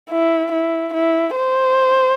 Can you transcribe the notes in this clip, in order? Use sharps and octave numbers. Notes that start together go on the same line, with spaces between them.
E4
E4
E4
C5